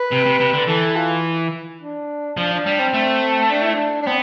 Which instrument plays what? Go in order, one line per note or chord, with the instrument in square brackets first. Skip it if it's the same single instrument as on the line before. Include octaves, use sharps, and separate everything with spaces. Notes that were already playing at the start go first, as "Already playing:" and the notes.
Already playing: [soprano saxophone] B4
[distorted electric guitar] C3
C3
C3
D3
[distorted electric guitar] E3 [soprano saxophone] A4
[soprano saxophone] F4
D4
[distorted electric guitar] F3 [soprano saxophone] D4
[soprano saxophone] D4
[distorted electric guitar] G3 [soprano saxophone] D4
[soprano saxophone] C4
[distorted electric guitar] A3
[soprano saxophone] D4
E4
D4
D4
[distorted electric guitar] B3 [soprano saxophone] C4